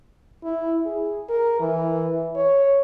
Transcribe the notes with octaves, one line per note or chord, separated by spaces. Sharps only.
E4
G#4
A#4
E3
C#5